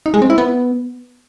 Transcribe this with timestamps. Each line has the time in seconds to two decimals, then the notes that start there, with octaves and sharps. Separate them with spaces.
0.06 D#4
0.14 G#3
0.22 C4
0.30 E4
0.38 B3